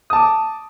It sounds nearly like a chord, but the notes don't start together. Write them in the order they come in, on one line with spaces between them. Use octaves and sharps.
D#6 A5 D6